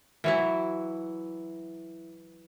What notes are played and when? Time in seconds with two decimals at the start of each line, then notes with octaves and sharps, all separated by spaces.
0.24 E3 F#3 E4